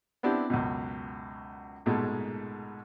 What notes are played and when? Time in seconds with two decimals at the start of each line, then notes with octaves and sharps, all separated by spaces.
0.23 B3 C4 D4 E4 G4
0.50 C#2 F#2 B2
1.86 A#1 G#2 B2 G#3 A3